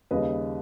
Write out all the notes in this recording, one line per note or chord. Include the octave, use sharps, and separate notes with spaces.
D#2 C#3 G3 B4 D#5